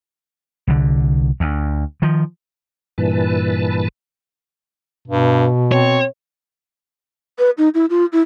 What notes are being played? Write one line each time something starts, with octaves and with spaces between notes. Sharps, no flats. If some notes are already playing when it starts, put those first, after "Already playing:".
C2 D3
D2
D#3 F3
G2 A#2 E3 B4 A5
G2 B2
C4 C#5
B4
D#4
E4
F4
E4